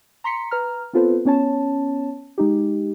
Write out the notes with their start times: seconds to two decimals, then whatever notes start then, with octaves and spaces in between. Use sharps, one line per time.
0.24 A#5 C6 B6 C#7
0.51 B4 A#5 F6
0.93 B3 C4 F4 A4 B4 C5
1.25 B3 C#4 C#5 A5
2.38 G#3 D#4 G4